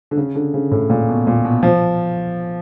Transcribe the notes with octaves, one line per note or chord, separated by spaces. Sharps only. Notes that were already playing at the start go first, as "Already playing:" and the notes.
D3
C#3
D3
C#3
A2
A#2
B2
A#2
B2
F3